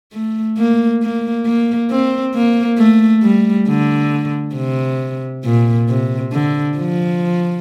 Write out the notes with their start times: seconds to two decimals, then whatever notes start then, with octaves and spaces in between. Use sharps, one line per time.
0.13 A3
0.58 A#3
1.02 A#3
1.46 A#3
1.91 C4
2.35 A#3
2.78 A3
3.23 G3
3.68 D3
4.55 C3
5.44 A#2
5.89 C3
6.32 D3
6.77 F3